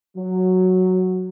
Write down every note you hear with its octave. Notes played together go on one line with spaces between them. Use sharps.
F#3